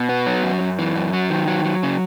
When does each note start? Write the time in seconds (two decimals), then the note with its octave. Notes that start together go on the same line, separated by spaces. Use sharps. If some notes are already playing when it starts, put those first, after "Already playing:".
Already playing: B2
0.09 B3
0.26 F#3
0.43 F#2
0.61 F#2
0.79 E3
0.96 F#2
1.13 F#3
1.31 D#3
1.48 F#3
1.65 F#3
1.83 C#3